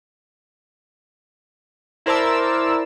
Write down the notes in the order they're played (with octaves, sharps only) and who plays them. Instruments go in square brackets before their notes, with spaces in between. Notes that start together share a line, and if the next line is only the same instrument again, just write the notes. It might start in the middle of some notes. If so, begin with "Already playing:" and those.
[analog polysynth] E4 A#4 C5 D5 A5 E6